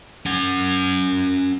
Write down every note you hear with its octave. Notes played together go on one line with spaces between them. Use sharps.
C#4 F#5